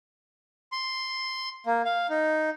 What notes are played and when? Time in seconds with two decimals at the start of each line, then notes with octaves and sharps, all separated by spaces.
0.72 C6
1.66 A#3
1.85 F5
2.09 D#4